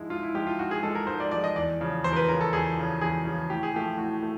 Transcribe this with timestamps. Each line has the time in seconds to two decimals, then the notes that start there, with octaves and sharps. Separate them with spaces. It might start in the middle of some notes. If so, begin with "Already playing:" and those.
Already playing: G#2 F3 G#3 E4
0.10 G#2 F4
0.23 E4
0.35 F3 G#3 G4
0.47 F4
0.58 G#2 F#4
0.71 G#4
0.83 F3 G#3 A4
0.95 A#4
1.07 G#2 C5
1.20 D5
1.31 F3 G#3 D5
1.44 D#5
1.56 E2 D5
1.80 C#3 F3
2.04 E2 C5
2.12 A#4
2.16 B4
2.29 C#3 A#4
2.31 F3
2.41 A4
2.53 E2 G#4
2.77 C#3 F3
3.01 E2 G#4
3.25 C#3 F3
3.50 A2 G4
3.63 G#4
3.74 F3 A3 G4
3.98 A2 F#4
4.23 A3